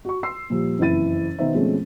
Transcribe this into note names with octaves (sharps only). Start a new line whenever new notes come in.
F#4 C#6
C6 E6 C7
A#2 F3 G3
F#1 F2 E3 E4 A6 D#7
B2 D#3 B3 D#4 C5 E5
B2 F3 G#3 A3 C4 C#4